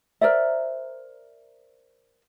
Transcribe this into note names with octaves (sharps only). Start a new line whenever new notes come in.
A#4 C5 D5 E5